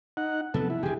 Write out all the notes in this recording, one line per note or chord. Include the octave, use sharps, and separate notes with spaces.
D#4 F#5
C3 F3 F#3 B3 A4
E4
E1 D3 G4 G#4